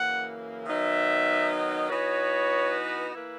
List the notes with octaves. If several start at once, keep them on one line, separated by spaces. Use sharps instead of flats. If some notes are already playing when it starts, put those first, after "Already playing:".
Already playing: F#2 C#3 E3 A#3 F#5
D#3 F#3 B3 D#4 E5
E3 B3 D#4 F#4 B4 C#5
E3 A#3 E4 B4